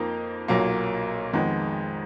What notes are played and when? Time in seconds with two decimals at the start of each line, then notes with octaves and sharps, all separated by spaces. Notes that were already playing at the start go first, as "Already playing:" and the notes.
Already playing: F2 F3 A#3 D#4 A#4
0.48 B1 A#2 F#3 A#3
1.33 F2 D#3 G#3 B3